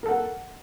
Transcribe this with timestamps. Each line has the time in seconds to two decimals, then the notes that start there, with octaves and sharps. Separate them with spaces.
0.03 A#4
0.06 A4
0.08 F#5